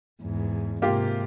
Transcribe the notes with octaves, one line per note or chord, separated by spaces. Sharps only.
E2 G#2
G#2 C3 A#3 F4 G4